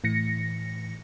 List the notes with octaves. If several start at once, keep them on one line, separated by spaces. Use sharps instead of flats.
A2 E3 A#6 C#7